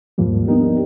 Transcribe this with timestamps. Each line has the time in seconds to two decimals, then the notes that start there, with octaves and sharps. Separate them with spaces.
0.18 D#2 G#2 F3 G3 A#3
0.47 B3 D4 D#4 G4 A#4